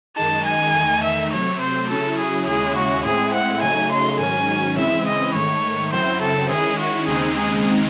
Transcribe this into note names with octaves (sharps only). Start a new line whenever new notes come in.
F#2 D#3 G#3 D#4 A5
G#5
E2 D#3 A3 D#4
E5
C3 F#3 A3 C4 C#5
C5
C#3 F#3 C#4 E4 A4
G#4
D#2 C#3 G#3 C#4 E4 G#4
F#4
A2 G#3 C4 E4 G#4
F#5
C#3 F#3 A3 D#4 G#5
C6
G#2 D#3 F#3 C#4 G#5
C#3 E3 G#3 C4 E4 E5
D#5
G#2 D#3 A3 C#5
F#2 C#3 F#3 C4 E4 C5
A4
D#3 G#3 C#4 E4 G#4
F#4
D#2 C#3 G#3 C4 D#4 G#4
G#4